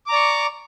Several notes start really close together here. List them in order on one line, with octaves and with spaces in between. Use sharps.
D6 A#5 D5 C#6